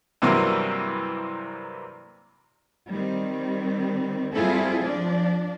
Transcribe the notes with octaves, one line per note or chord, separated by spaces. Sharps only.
G2 C3 E3 F#3 A#3 C4
D#3 G3 C4
G3 C4 E4 F4 G#4 A4
F3 D4 D5